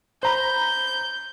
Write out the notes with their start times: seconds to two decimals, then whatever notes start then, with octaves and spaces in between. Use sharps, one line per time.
0.23 C5 A#5 B5 G6